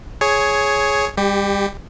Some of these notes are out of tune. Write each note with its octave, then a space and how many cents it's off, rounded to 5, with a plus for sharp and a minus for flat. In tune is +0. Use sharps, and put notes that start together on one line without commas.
G#4 +10 C#5 +0
G3 +35 G4 +0